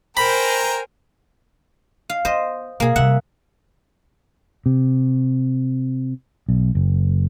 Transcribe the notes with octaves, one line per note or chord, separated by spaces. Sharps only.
A#4 C5 G5 G#5 A#5 B5
F5
B3 C5 D#5
B2 A#3 G#4
C3 G3 E5 F#5
C3
B1
F#1